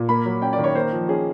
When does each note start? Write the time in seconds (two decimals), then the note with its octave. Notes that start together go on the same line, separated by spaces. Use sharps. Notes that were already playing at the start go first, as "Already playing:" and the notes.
Already playing: A#2
0.09 A#3 B5
0.25 F#3
0.42 C#4 G5
0.53 D5
0.58 D#3
0.64 C#5
0.75 A#3 C5
0.92 F3
1.08 C#4 G#4